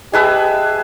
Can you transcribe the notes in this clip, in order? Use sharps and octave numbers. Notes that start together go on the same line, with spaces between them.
G4 G#4 B4 D#5 E5 A5